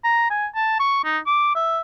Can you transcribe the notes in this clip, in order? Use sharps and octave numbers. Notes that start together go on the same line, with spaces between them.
A#5
G#5
A5
C#6
D#4
D6
E5